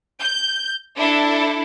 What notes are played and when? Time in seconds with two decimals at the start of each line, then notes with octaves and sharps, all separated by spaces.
0.21 G6
0.95 D4 E4 A4